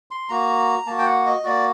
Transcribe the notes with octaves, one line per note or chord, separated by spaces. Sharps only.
C6
A#3 F#4 A#5
A#3 F#4 A5
G5
F#5
D#5
A#3 F#4 D5